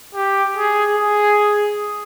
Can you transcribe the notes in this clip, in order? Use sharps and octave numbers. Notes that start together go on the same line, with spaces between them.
G4
G#4
G#4